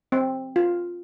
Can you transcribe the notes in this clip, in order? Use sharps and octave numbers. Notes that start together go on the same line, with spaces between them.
C4
F4